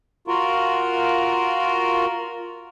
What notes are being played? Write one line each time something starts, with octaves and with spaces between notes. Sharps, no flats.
F4 F#4 A#4